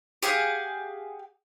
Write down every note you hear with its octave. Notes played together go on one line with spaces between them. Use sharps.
G4 G#4 F5 F#5